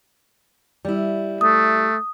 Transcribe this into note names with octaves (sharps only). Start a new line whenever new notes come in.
G3 E4
A3 D#6